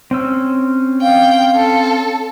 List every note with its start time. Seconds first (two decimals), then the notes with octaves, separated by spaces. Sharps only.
0.11 C4 C#4 E6
1.02 F5 G5
1.56 A4